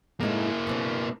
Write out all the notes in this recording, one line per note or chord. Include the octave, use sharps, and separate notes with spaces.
A2 G#3 A#3 D#4 E4
B2 C4 D4